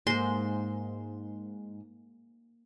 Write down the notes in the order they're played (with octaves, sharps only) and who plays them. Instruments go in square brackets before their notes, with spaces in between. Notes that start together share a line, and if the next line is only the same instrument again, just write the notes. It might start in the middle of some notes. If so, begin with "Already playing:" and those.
[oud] G#2 [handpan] A#3 [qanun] C5 C6